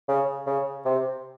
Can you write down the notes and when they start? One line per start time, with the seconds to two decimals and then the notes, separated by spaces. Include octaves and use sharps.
0.08 C#3
0.46 C#3
0.85 C3